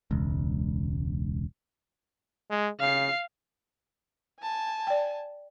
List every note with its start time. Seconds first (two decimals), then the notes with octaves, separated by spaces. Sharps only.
0.11 E1 C#2
2.50 G#3
2.80 C#3 F5 C7
4.41 G#5 A5
4.87 D5 G5